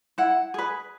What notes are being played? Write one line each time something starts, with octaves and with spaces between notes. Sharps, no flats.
E4 F#5
G#4 B4